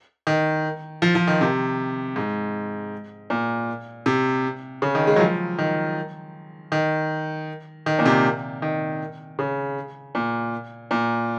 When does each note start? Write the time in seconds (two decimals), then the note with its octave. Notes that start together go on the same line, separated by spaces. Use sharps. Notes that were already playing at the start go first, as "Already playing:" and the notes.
0.27 D#3
1.02 F3
1.15 F3
1.27 D#3
1.41 C3
2.16 G#2
3.30 A#2
4.06 C3
4.82 C#3
4.95 D#3
5.07 G#3
5.16 F#3
5.20 F3
5.58 D#3
6.72 D#3
7.86 D#3
7.99 A#2
8.06 C3
8.62 D#3
9.39 C#3
10.15 A#2
10.91 A#2